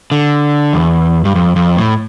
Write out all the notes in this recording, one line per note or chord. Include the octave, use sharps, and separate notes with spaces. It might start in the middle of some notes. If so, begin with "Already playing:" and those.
D3
E2
G2
F2
F2
A2